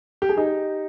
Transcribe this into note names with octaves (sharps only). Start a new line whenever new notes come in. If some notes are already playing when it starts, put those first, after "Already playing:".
G4
G#4
D#4 G4